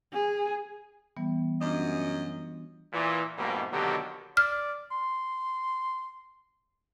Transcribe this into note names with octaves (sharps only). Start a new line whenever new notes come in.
G#4
E3 G3 B3
F#2 D4 F4 D#5
A#2 E3
F2 G#2 B2 G3 A3 A#3
B2 D3 D#3 F#3 A#3 G4
D5 F6
C6